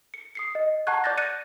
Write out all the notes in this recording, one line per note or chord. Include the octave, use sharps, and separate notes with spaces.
C#7
D#6 C7 C#7
D#5
F#5 A5 A#5 C#6 F#6 G#6
D5 D6 F#6 G6 A6 A#6
F#6 A6 A#6 C#7 D#7